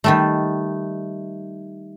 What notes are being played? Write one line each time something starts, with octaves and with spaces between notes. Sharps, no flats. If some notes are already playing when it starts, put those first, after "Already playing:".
D#3 G3 A3